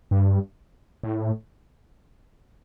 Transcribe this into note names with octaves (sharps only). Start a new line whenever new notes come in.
G2
A2